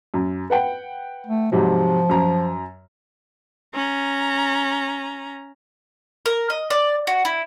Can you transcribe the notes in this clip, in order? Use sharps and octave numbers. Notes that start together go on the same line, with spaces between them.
F#2
B4 F#5 G5
A3
G#2 C3 F3 F#3
F#2 A#5
C#4 A#5
A#4
D#5
D5
F#4
E4